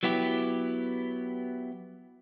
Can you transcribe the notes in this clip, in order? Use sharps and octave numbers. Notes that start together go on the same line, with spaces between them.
F#3 B3 E4 G4